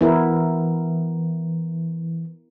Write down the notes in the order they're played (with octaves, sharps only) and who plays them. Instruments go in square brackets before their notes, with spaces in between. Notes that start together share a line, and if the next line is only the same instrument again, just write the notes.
[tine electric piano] E3 [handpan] B3 E4 A#4